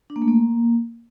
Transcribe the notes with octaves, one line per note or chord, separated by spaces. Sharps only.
D4
A#3
A3
A#3